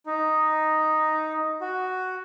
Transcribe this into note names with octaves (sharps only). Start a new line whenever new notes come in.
D#4
F#4